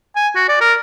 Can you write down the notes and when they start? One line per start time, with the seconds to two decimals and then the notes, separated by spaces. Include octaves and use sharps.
0.16 G#5
0.35 F#4
0.49 D5
0.61 A#4